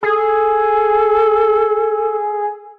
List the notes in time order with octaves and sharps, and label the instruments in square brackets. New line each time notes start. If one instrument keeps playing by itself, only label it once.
[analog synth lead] G#4 [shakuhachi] A4